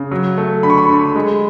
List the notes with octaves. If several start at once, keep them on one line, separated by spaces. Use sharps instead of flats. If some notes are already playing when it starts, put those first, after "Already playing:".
Already playing: C#3
F#3
A3
D3 B5
C#6
B5
D3
G#3